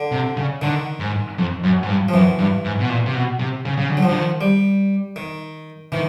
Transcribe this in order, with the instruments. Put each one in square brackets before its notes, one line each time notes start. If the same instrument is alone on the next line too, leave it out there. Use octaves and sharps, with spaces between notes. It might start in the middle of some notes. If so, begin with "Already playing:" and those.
Already playing: [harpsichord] D3
[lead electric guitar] C3
C#3
[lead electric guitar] D3 [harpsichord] D#3
[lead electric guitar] G#2
F2
F#2
G#2
G2
[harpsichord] F3
[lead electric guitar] F#2 [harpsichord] E3
[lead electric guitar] G2
G#2
B2
A#2
C3
B2
C3
C#3
C#3
D3
[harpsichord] F#3
F3
[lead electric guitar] D3
D#3
[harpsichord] G3
D#3
[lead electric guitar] D#3 [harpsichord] E3